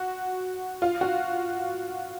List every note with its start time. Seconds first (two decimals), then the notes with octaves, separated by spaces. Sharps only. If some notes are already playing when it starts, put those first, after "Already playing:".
Already playing: F#4
0.82 F4
1.01 F#4